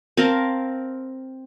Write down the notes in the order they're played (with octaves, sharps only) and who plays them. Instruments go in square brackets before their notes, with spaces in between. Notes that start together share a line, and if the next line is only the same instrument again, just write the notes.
[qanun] C4 A#4 F5 A5